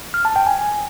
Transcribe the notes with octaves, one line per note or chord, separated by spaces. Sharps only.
F6
A5
G5
G#5